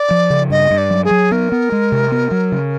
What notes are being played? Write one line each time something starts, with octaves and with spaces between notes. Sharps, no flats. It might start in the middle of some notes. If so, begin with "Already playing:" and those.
Already playing: D5
F3
C#3
G2 D#5
G2
D5
F#3
G#4
F#3
B3 A#4
B3
G#3
C3
B3
F#3
C#3